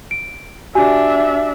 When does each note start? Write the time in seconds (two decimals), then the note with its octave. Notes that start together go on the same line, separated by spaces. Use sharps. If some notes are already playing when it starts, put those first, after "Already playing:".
0.11 D7
0.75 D4 F#4 G4 E5 G#5